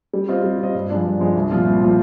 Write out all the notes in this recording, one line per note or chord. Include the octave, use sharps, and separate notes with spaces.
G3
C4 F4 C5 D#5
G3
C4 F4 C5 D#5
G2
F3 G#3 D4
G2
F3 G#3 D4
C2
A#2 F3 C4 F4
C2
A#2 F3 C4 F4